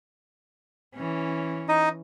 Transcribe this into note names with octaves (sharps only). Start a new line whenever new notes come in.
E3 C#4
D#4 D#5